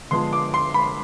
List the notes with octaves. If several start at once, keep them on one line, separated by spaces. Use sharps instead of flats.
D3 F3 G#3 B3 D4 C6
D6
C6
B5